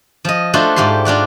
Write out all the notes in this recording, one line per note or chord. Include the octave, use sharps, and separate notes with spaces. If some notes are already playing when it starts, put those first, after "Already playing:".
F3 D#5
A3 D4 F4 F#4 A4 C5
G#2 A3 G4 F5 C6
D4 F4 F#4 D5